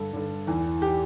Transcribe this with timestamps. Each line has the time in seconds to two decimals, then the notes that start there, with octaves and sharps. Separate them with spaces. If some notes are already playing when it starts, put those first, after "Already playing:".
Already playing: G2 D3 A4
0.13 G2 D3
0.47 E2 E3
0.82 G4
0.85 E3